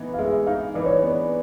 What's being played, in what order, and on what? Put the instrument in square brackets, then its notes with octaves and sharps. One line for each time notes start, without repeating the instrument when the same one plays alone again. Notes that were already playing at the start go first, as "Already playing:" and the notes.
Already playing: [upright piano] E3 B3 D#4
[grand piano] F5
[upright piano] G#3 [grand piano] E5
[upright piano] D#4 [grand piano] F5
[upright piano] E3 [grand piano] D5
[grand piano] C#5
[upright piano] B3 [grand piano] D5